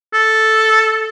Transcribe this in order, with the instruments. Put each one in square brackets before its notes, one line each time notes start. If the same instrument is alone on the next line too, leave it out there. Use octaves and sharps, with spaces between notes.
[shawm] A4